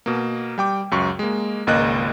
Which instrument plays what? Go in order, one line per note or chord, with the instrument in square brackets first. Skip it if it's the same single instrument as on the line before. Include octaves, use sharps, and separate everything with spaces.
[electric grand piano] B2 A#3
G3 G5 D6
C#2 F#2 C#6
G#3 A#3
G#1 C#2 A#3 D#5 F#6